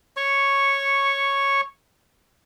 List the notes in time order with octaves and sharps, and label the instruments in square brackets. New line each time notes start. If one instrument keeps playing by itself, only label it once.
[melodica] C#5 C#6